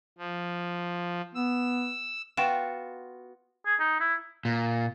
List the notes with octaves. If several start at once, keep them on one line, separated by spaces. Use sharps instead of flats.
F3
B3 E6
B3 F4 F#4 G5 E7
G#4
D#4
E4
A#2